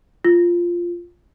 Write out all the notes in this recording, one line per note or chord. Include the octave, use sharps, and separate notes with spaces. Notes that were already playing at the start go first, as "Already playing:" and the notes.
F4